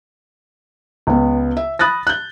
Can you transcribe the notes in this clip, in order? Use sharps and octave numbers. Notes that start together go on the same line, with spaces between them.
C#2 B3
E5
B5 D#6 F#6 A6 A#6
F#6 G6